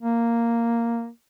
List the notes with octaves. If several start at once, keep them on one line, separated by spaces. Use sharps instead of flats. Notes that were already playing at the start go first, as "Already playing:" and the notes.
A#3